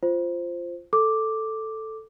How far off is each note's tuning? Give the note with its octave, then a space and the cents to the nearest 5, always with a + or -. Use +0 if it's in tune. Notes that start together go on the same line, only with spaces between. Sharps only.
F4 -10 C5 +0
A4 +0 D6 +0